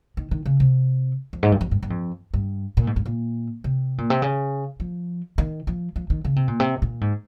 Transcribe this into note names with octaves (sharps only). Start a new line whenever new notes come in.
D#3
D#3
C#3
C3
F2
G#2
G2
F2
G2
G2
F2
G2
A#2
G#2
G2
A#2
C3
A#2
C3
C#3
F3
D#3
F3
F3
D#3
C#3
C3
A#2
C3
A#2
G#2